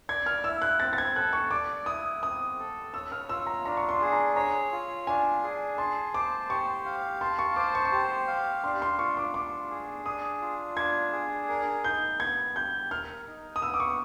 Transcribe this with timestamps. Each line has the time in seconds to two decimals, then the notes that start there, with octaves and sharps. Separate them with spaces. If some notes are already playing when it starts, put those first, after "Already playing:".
0.09 D5 G#6
0.26 F6
0.44 E4 E6
0.62 F#6
0.80 C4 A6
0.93 A6
0.98 G#6
1.16 A4 F#6
1.33 C#6
1.51 D5 D6
1.86 E4 D#6
2.22 C4 D#6
2.59 A4
2.94 C#5 E6
3.12 F6
3.29 F4 E6
3.47 A#5
3.66 D4 A#5
3.77 C#6
3.89 C6
4.01 G#4
4.12 A#5
4.36 C#5 A#5
4.72 F4
5.07 D4 G#5
5.44 G#4
5.78 A5 C6
6.14 C5 D6
6.50 G4 C#6
6.85 F5
7.21 A5 C6
7.39 C#6
7.56 C5 D6
7.75 C#6
7.85 C#6
7.92 G4 C6
8.27 F5
8.64 D4 C6
8.82 C6
8.99 F4 C#6
9.17 D6
9.34 D4 D6
9.70 G#4
10.06 D4 D#6
10.41 F4
10.77 D4 G#6
11.12 G#4
11.49 A#4
11.84 D#4 G6
12.19 B3 G#6
12.55 G4 G6
12.90 A#4 F6
13.27 D#4
13.56 D#6
13.62 B3 E6
13.74 D6
13.80 C#6